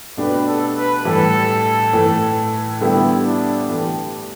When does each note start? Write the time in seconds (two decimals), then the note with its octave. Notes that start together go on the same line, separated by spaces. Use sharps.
0.17 B2 A3 D4 G4 B4
0.47 A4
0.76 B4
1.05 A2 E3 G3 A4
1.93 A2 E3 A3
2.81 D3 G3 B3 E4 G4
3.26 D4
3.69 E3 A3 G4